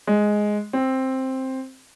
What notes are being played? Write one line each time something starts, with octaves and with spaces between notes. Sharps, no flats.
G#3
C4